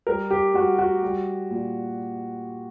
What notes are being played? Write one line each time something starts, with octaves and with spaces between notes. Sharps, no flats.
G3 A#4
G4
G3 F#4
F#4
G3
A#2